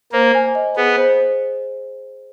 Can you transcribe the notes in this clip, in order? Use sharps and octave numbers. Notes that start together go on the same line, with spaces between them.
A#3 C5
G#5
D#5
B3 G#4
C5